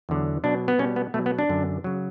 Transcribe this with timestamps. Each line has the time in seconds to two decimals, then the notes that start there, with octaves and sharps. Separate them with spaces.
0.09 E2 D3 F#3
0.44 B2 F#3 D4
0.68 B3
0.79 B2 G3 C#4
0.96 B3
1.14 B2 F#3 A3
1.26 B3
1.39 D4
1.49 F#2 D3 F#3
1.84 C#3 F#3